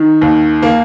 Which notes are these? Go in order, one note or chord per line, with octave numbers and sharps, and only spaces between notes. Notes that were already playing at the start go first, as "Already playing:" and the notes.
Already playing: D#3
D#2
A#3